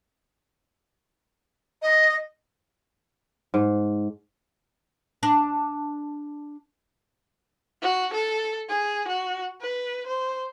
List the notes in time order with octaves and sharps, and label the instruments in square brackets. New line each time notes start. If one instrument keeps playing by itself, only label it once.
[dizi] D#5
[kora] G#2
[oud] D4
[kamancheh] F#4
A4
G#4
F#4
B4
C5